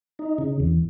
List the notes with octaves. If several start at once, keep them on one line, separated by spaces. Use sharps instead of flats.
D#4
C#3
E2